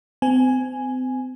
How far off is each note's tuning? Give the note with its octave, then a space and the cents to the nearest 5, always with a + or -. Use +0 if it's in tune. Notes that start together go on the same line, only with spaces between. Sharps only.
C4 -35 G#5 +0